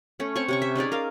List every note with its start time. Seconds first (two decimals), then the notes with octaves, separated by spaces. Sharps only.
0.20 A3 C#4
0.36 C4 C#5 G#5 C#6
0.48 C3 C#4 C#6
0.62 E5
0.75 C#4 D#4 G#4 D5
0.92 A#4 D#5 F5